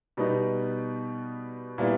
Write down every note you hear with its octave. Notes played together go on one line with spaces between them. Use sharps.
B2 G3 B3 D#4
A#2 G3 B3 E4